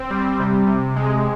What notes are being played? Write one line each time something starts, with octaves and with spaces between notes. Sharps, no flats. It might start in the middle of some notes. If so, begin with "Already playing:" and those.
Already playing: C4
G3
C3
C3
G#3